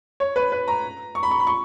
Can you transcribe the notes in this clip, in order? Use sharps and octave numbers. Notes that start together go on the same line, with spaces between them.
C#5
B4
B4
A#5
C#6
B5
C#6
B5
C#6